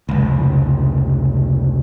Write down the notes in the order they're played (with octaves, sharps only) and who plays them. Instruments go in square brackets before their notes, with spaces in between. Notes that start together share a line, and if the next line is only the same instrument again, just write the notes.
[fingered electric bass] F1 C#2